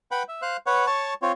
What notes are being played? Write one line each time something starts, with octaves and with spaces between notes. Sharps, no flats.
B4 F#5 G5 B5
E5
C5 F5 F#6
B4 C#5 F#5
C#5 A5 C#6
C4 F4 C#5